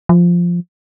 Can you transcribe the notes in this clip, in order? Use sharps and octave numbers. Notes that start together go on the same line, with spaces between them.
F3